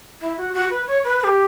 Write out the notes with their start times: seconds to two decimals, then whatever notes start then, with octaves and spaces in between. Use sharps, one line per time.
0.20 E4
0.37 F#4
0.53 F#4
0.70 B4
0.87 C#5
1.04 B4
1.20 B4
1.23 G4